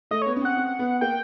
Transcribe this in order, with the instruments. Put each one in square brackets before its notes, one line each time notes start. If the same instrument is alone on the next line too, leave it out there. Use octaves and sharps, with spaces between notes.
[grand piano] A3 [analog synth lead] D#5
[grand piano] B3 [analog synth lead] C#5
[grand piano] C#4
[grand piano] C4 [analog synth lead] F#5
[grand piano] C4
B3
[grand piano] A#3 [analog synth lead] G5